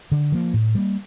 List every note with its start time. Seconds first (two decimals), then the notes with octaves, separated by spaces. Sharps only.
0.12 D3
0.32 F3 A#3
0.54 A2
0.75 G3 A#3